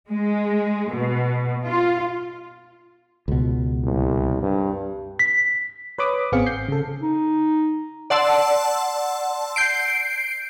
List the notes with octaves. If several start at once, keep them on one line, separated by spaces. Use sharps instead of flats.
G#3
B2
F4
C#2 B2
C2
G2
B6
B4 C#5 B5 D6 D#6
G#1 B3 C4 G#4 F5 C#7
G6 C7
C#3 A4
D#4
D5 F#5 A5 C6 E6
G6 C7 D7